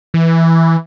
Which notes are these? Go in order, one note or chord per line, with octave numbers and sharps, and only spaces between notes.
E3